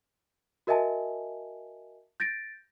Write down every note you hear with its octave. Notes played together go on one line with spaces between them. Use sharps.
F#4 A#4 D#5 E5 G#5 A5
G6 A6 A#6 D7